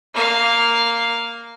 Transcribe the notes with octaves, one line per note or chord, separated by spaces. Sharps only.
A#3 F5